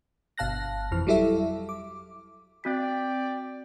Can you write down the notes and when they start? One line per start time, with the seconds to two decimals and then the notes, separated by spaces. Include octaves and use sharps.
0.38 G1 B2 F5 A5 F#6 A#6
0.92 F2 E3 F6
1.07 F#3 G3 E4 A4 E5
1.69 D6
2.64 C4 F#4 D5 G5 B6